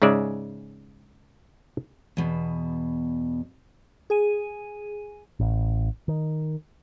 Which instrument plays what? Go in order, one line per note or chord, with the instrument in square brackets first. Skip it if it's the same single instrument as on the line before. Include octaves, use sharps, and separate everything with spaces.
[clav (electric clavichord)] G#2 C#3 G#3 D5 E5
[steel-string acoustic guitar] E2 B2
[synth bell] G#4 G#5 D#7
[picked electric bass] A1
D#3